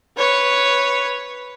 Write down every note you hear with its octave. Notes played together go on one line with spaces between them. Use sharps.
B4 C#5